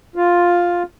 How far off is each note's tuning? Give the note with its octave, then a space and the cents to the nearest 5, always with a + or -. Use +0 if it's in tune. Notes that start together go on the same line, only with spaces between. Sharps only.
F4 +5